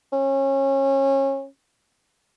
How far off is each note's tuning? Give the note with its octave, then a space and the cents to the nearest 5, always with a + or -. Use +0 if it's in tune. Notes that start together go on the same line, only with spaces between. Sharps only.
C#4 -25